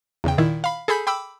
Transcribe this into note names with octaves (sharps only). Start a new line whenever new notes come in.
E2 C#3 G5
A#2 D#3 E4
F5 B5
G#4 A4 G#5 B5 G6 B6
G5 B5 D6 E6